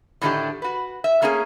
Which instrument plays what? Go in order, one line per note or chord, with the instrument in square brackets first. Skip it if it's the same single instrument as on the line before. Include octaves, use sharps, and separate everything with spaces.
[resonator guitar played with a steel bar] A2 D3 D#3 A3 D4 G4
F#4 B4
E5
A3 A#3 C#4 F4 G#4